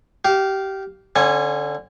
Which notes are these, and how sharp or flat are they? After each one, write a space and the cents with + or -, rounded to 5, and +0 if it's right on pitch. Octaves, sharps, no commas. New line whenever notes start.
G4 -20 F5 +0
D3 +0 C#4 -35 G#5 +0